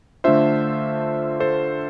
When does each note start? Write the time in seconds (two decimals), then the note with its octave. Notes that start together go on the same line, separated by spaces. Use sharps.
0.24 D3 A3 D4 F4 C5 E5
1.40 A4 C5